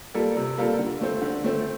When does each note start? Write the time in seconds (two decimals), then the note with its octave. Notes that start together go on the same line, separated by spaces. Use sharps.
0.14 G3 A#3 F4 A4
0.37 C3
0.58 G3 A#3 F4 A4
0.79 D3
1.01 A3 C4
1.22 D3
1.44 A3 C4